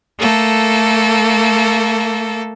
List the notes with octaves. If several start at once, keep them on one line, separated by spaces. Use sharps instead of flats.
A3 A#3 A4